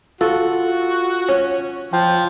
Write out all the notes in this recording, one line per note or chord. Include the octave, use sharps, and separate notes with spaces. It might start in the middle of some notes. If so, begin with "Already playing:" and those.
F4 F#4 A4
C#4
F3 G5